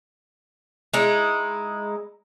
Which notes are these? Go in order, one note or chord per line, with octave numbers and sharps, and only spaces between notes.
G#3 D#4 E4